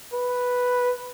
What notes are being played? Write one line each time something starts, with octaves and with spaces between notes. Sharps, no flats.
B4